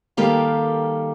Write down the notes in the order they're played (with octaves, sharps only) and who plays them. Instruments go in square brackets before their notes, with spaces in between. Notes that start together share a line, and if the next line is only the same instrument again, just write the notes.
[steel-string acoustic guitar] D#3 G3 A#3 G4 A4 F5